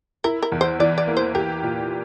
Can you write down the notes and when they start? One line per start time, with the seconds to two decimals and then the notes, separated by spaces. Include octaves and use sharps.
0.24 E4 A#4
0.42 A#4
0.52 E2
0.61 C5
0.80 E3 D5
0.98 D5
1.07 A#3
1.17 C5
1.35 G4 A#4
1.63 A#2